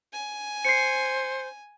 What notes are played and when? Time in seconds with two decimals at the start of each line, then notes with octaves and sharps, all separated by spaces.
0.13 G#5
0.65 C5 C7 C#7